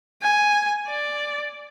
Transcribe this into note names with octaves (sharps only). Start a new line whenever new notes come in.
G#5
D5